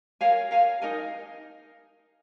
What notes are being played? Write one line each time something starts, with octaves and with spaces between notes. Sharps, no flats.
A#4 C#5 F5 G#5
A#4 C#5 F5 G#5
D#4 A#4 D#5 G#5